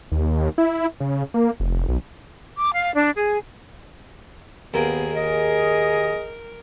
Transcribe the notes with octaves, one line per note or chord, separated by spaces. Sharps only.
D#2
E4
C#3
A#3
F1
B1
D6
F5
D4
G#4
D#2 A#3 B3 G#4 G5
G#4 A#4 D#5